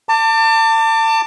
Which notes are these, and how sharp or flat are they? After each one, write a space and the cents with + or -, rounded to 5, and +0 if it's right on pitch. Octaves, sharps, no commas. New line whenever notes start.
A5 +35 D6 +0